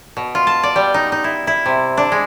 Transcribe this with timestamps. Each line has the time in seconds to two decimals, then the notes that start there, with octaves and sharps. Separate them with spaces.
0.17 B2
0.35 F4
0.47 A5
0.63 D5
0.76 G3
0.94 D#4
1.12 D#4
1.24 E4
1.47 E4
1.66 C3
1.97 D4
2.12 G#3